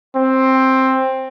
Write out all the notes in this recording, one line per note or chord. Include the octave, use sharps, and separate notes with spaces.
C4